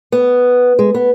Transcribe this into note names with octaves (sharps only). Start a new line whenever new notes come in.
B3
G#3
B3